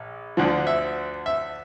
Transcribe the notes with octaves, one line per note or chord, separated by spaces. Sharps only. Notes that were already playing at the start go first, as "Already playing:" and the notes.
Already playing: A#1
D2 D3 F3
E5
E5